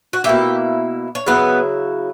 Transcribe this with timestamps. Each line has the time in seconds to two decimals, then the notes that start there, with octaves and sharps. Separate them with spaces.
0.13 F#4
0.24 B2 A#3 E4 G4
1.15 C#5
1.26 C#3 F#3 B3 E4 B4